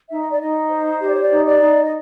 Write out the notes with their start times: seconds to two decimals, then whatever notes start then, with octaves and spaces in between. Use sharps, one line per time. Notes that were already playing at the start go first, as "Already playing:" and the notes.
0.10 D#4 E5
0.20 D#5
0.29 D5
0.40 D#4 D#5
0.69 C5
1.00 G4 D#5
1.07 D5
1.14 C#5
1.21 D5
1.30 D#4
1.45 D5
1.60 D#4
1.83 D#5